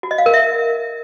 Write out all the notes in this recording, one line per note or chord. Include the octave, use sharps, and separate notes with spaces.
F#4
D#5
F5
A#4
E5